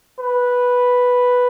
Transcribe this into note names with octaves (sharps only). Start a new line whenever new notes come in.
B4